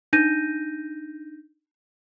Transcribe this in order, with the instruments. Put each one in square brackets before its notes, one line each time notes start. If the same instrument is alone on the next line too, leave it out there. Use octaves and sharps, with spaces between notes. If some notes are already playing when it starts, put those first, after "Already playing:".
[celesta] D4 D#4 G6 A#6 D#7